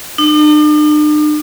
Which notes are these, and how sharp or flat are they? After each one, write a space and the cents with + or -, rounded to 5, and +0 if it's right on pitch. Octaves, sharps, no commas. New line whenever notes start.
D4 +45